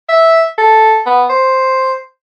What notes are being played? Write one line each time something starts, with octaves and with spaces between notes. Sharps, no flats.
E5
A4
B3
C5